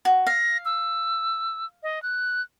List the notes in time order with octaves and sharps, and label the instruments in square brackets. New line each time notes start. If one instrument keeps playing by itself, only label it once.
[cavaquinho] F#4
[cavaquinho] F5 [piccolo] A#6
[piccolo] E6
D#5
F#6